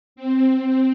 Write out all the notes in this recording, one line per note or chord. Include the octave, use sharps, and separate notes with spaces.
C4